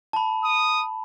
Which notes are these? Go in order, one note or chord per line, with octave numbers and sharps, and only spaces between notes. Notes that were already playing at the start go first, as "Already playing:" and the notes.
A5 B5
D#6